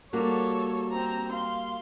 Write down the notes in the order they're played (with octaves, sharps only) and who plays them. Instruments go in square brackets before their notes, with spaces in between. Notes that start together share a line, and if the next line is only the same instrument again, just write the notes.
[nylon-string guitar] G3 A#3 F#4 [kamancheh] A4 C#5
[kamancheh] C4 A#5
F5 C6